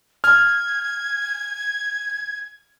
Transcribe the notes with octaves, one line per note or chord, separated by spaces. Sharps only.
F6 G#6